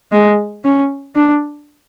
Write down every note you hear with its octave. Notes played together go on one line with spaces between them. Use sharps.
G#3
C#4
D4